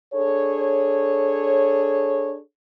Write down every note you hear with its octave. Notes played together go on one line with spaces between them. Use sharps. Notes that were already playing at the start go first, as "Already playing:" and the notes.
D4 G#4 A4 C#5